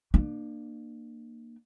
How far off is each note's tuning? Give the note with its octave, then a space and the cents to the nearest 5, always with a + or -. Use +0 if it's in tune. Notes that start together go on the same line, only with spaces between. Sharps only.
A#3 +0 D4 +35